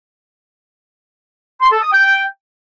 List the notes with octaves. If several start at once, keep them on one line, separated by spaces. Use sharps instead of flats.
C6
A4
D#6
G5